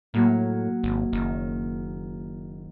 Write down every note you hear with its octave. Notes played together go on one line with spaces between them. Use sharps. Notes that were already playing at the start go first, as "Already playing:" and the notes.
A2 F#3 A#3
G#1
F#1 D#3